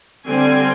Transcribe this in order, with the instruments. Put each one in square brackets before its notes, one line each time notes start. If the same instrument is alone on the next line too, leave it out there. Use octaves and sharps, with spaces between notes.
[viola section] D3 G3 C4 G#5